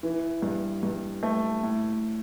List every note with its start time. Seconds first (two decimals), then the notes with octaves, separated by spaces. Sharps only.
0.03 E3
0.42 G2
0.83 G2
1.23 A3
1.63 A2